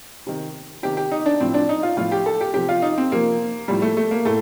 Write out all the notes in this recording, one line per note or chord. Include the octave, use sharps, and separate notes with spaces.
C3 D#3
C3 D#3 G4
G4
D#4
D4
A2 F3 C4
D4
D#4
F4
A2 F3 F4
G4
A4
G4
C3 F3 G4
F4
D#4
C4
C3 F3 A#3
A2 F3 G3
A3
A3
A#3
A2 A3